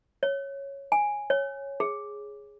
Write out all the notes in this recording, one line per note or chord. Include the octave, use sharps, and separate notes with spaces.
C#5
G#5
C#5
G#4